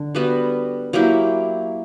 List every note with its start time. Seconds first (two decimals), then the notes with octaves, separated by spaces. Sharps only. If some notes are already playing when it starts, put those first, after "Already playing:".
Already playing: D3
0.15 G3 B3 F#4 B4
0.93 F#3 A#3 E4 G4